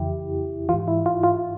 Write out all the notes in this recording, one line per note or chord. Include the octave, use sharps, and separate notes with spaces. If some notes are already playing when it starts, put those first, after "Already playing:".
Already playing: F2 C#3 E3 E4 G4
G#2 E3 F4
E4
F4
F4